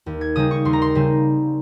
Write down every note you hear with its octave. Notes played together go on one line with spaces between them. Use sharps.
D#2
G#6
C#3 G3 C4 D#4 D#6
C#6
D#2 C6
A#5
C6
C#3 G3 C4 D#4